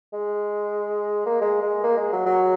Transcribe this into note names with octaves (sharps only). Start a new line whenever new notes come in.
G#3
A#3
G#3
G#3
A#3
G#3
F#3
F#3